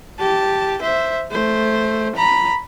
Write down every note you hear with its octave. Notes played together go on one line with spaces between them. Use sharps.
G4 A5
C5 E5
A3 C5
A#5 B5